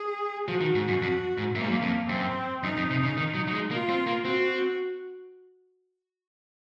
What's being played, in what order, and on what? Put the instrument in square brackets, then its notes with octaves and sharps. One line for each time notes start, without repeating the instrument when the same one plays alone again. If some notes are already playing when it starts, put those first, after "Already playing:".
Already playing: [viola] G#4
[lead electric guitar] F3 [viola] F#4
[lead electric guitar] D#3
G#2
F#2
F2
G#2
[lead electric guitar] F#2 [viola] A#3
[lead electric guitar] G#2
F#2
F2
[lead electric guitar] F#2 [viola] C4
[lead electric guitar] F#2 [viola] D#4
[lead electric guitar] F2
C3
C#3
D#3
F#3
F#3
G#3
[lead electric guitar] A#3 [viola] F4
[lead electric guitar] C4
A#3
[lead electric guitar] C4 [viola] F#4